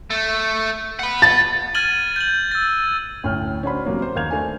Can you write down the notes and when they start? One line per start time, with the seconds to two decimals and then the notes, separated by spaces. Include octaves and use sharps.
0.10 A3
0.99 F#5 B5
1.22 A6
1.74 F6 G#6 A6 D#7 F#7 G7
2.16 G6 F#7
2.51 E6 A6
3.24 D2 A2 C#4 G5 F6
3.63 C#4 D4 F#4 C5 B5
3.85 C3 F#3 A#3 C#4
4.02 C5
4.15 D#2 A#4 F5 G6 G#6 F7
4.31 A3 D4 G#5